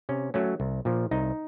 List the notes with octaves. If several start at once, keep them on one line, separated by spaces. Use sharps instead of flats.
C3 C#4
F#3 A3 C#4
C2
A#2 F3
C2 D#4